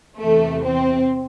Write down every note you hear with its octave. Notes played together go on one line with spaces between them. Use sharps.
E2 C3 E3 A3
C4